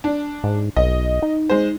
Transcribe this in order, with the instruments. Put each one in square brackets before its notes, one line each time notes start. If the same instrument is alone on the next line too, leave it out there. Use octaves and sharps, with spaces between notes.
[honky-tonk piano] D4
[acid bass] G#2
[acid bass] B1 [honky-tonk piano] D#5
[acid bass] D#4
[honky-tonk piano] G#3 C5